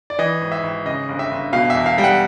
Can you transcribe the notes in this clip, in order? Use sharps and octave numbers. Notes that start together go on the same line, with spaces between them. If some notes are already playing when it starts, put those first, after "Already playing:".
D5
E3 D#5
G#1
E5
G#1
C#3 D#5
G1
E5
G1
B2 F5
E2 E5
F5
G3 G5
F#5